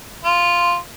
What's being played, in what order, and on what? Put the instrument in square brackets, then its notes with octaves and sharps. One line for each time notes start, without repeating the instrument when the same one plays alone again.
[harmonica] F4